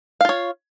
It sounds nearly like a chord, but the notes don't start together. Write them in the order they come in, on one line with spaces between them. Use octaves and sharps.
F5 F4 C#5